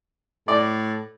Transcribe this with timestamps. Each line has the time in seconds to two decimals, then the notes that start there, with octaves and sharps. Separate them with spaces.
0.48 A2 D5